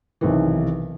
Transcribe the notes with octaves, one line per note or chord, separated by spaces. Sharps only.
B1 C3 D#3 E3